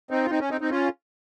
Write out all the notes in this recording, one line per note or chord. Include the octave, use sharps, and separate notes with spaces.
C4 D#4
F4
C4 D#4
C#4
C4 D#4
C4 D#4
C#4 F4